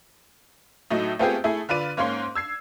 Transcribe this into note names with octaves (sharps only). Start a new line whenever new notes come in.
A2 F#3 A3 D#4
A3 B3 C4 F4 G4 G#4
A3 E4 G#4
D3 F4 B4 D5 D#7
G#2 A#3 C#4 F5 C6
E6 G#6 C7